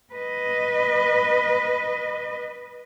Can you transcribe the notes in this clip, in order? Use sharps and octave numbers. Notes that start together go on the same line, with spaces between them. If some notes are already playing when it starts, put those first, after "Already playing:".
B4 D#5